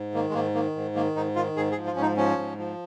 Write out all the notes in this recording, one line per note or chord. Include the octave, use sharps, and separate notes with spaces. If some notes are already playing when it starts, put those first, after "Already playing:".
Already playing: G#2
D#3 A#3
G#3
G#2 A#3
D#3 A#3
G#2
D#3 A#3
G#2 D#4
D#3 F4
G#2 G#4
G#4
F3
F4
G#2 C#4
D#4
F3 C#4
G#2
F3